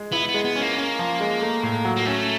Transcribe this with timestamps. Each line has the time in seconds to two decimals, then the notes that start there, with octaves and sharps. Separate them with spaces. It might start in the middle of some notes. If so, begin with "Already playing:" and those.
Already playing: G#3
0.12 B3 E4
0.28 B3
0.34 G#3
0.44 B3
0.56 C#4
0.61 A#3
0.77 C#4
0.99 F3
1.20 G#3
1.41 A3
1.63 A2
1.85 F#3
1.97 A#3
2.06 A3 C#4